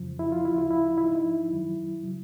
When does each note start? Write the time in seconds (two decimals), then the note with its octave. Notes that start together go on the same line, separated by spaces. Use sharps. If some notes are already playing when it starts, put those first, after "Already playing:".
Already playing: F2 C#3 F3
0.19 E4
0.32 F4
0.45 D2 C#3 F3 E4
0.58 F4
0.71 E4
0.97 G#2 E4
1.02 F3 D#4
1.15 E4
1.50 F#2 D#3 F#3
2.03 C#3 F#3